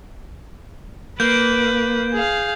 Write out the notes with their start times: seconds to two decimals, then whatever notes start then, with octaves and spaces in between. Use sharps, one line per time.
1.20 A#3 B4 G6
2.13 G#4 F5